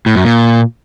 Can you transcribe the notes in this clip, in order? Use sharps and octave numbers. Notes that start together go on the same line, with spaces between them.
A2
F#2
A#2